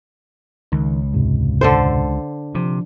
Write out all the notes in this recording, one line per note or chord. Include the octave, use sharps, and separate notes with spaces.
C#2 D#3
E2 G#2 C3
D3 A4 C5
C3 F3